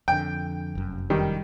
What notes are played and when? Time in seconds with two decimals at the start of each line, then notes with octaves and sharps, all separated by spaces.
0.08 F2 D3 G5
0.75 F1 F#2
1.10 D#3 G3